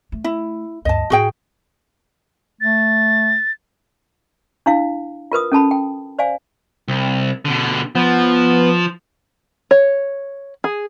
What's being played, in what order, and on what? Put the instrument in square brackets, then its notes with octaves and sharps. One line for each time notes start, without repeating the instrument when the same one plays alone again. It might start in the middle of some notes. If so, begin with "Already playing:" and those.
[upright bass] A3
[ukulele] E4
[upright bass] D2 G2 [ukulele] D#5 A5
[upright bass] A2 [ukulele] F#4 G#4 G5
[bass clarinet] A3 [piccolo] A6
[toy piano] D4 E4 F5
F4 A#4 B4 D#6
C#4 A4 A5 B5
G5
C5 D5 F5 G#5
[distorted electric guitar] C2
B2 D3
[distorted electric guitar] F3 [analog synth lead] B3
[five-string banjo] C#5
G#4